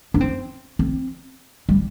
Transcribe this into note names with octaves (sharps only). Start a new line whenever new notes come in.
D4
C4
C4
G3